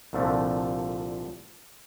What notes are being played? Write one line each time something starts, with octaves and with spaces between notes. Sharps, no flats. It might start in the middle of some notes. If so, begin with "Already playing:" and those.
C2 A#2 D3 F3 A3